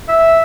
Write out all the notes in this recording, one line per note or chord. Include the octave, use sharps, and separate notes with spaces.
E5